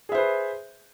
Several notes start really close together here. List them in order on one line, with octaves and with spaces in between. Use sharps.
G#4 E5 C5 B4